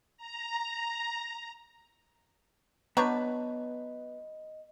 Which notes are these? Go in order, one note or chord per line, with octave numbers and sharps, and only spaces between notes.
A#5
F#3 B3 D4 B4 D#5 A#5 C#6 G6